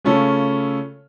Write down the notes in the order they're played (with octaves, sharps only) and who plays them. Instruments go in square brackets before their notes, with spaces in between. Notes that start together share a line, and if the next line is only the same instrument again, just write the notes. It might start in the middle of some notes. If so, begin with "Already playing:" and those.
[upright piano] C#3 A3 C#4 F4 A4